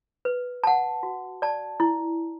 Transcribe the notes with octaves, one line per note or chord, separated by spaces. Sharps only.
B4
F#5 A5
F#4
D5 A5
E4